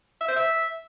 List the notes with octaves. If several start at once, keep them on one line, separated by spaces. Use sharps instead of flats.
E5
C5
E5